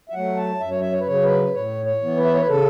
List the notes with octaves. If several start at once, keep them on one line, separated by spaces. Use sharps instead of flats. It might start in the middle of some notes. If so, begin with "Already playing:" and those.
E5
F#3 A3 F#5
A5
F#2 E5
C#5
E5
C#5
B4
C#3 F#3 C#5
B4
A2 C#5
C#5
E3 B3
B4
E5
C#5
B4
C#3 A4